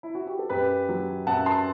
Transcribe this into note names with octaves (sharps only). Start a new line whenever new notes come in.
E4
F#4
G4
A4
F#2 G4 B4
F#3
F#2 F#5 A5
A5 C6